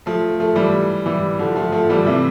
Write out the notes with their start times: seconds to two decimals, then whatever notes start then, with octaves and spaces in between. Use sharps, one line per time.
0.06 F3 A3
0.40 F3 A3
0.56 E3 G3
1.06 E3 G3
1.39 D3 F3
1.56 F3 A3
1.72 F3 A3
1.90 E3 G3
2.06 C3 E3